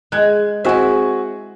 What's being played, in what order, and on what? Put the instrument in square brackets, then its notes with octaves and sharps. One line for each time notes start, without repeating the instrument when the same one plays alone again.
[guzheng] G#3 [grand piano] F#6 G#6
[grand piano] C4 F#4 G#4 [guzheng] E4 E5